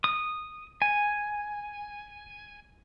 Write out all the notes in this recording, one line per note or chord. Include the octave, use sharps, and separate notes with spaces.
D#6
G#5